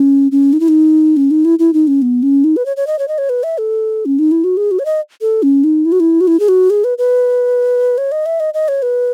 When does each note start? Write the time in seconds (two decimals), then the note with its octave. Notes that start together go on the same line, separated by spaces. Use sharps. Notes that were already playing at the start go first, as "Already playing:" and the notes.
Already playing: C#4
0.32 C#4
0.53 D#4
0.60 E4
0.68 D#4
1.17 C#4
1.31 D#4
1.45 E4
1.59 E4
1.73 D#4
1.87 C#4
2.02 B3
2.23 C#4
2.44 D#4
2.56 B4
2.66 C#5
2.77 C#5
2.87 D#5
2.99 C#5
3.08 D#5
3.18 C#5
3.29 B4
3.43 E5
3.58 A4
4.06 C#4
4.19 D#4
4.31 E4
4.44 F#4
4.57 G#4
4.71 F#4
4.79 C#5
4.85 D#5
5.21 A4
5.43 C#4
5.64 D#4
5.85 E4
5.92 F#4
6.00 E4
6.21 F#4
6.27 E4
6.40 G#4
6.48 F#4
6.70 G#4
6.84 B4
6.98 B4
7.98 C#5
8.12 D#5
8.26 E5
8.40 D#5
8.54 D#5
8.68 C#5
8.82 B4